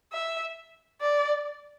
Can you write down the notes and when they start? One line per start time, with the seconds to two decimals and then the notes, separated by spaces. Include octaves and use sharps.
0.13 E5
1.01 D5